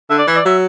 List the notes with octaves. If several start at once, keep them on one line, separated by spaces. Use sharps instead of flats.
D3 E5
D5
E3 E5
D5
F#3 E5